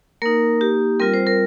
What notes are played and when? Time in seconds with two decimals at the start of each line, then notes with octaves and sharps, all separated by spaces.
0.22 A#3 D#4 A#4
0.61 G4
1.00 G3 C4 F4 A#4
1.14 C5
1.27 A#4